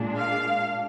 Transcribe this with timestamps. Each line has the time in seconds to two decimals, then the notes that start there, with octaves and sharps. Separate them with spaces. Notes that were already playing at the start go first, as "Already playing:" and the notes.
Already playing: A#2 G#3 D4
0.16 F5